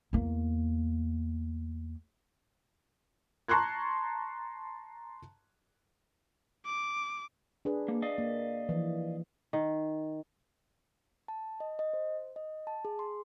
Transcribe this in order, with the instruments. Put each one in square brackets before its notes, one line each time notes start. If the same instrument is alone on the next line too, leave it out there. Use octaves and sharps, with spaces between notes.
[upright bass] E2 A#3
[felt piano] A5 A#5 C6 C#6 F#6 G#6
[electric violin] D6
[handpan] D4 G#4 B4
[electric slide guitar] A#3
D5 D#5 F5
[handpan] A#3
E3 F3
[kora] D#3
[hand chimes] A5
D#5
D#5
C5
D#5
A5
G#4
C6